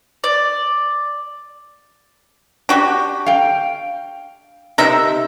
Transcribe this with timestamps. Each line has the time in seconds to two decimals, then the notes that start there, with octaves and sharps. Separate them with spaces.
0.24 D5
2.69 D4 F#4 G4
3.26 F5 G5
4.78 C3 D#4 A#4 E5